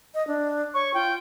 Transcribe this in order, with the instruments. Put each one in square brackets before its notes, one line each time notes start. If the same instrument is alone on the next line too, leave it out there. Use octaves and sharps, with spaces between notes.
[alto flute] D#5
D4
[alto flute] C#5 [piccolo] C#6
[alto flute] F4 [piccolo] G5